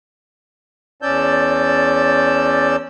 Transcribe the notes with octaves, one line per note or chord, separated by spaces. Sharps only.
E2 C#4 D5 A5 E6 G6